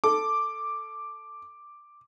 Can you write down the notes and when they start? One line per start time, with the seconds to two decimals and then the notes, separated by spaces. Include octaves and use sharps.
0.04 A4 D6